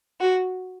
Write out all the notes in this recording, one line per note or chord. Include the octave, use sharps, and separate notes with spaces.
F#4